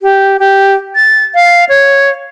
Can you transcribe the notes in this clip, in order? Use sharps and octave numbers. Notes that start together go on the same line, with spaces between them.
G4
G4
A6
F5
C#5